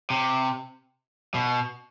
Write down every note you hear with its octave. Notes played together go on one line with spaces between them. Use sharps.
C3
B2